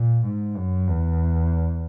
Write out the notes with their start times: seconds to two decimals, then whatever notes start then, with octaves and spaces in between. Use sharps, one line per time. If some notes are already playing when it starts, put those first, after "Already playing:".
Already playing: A#2
0.26 G#2
0.57 F#2
0.88 E2